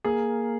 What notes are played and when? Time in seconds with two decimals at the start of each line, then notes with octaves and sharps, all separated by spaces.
0.05 A#3 G#4